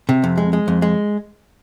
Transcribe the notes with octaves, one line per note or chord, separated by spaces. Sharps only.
C3
F2
G#3
G#3
F2
G#3